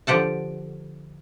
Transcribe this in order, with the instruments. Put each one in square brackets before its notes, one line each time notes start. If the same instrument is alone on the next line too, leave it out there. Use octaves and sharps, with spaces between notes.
[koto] D3 F3 G4 F#5 A5